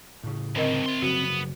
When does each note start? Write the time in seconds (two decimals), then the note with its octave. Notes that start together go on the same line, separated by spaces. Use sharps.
0.24 A2 C#3
0.56 G2 D3 D#3 C4 A#4 D#5
0.86 E4 C6
1.02 F#1 F3 B3 F#4